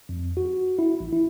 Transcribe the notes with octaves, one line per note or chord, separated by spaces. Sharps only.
F2
F#4
E4
A1
E4